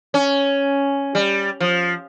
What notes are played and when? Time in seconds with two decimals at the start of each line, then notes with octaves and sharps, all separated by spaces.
0.14 C#4
1.15 G3
1.60 F3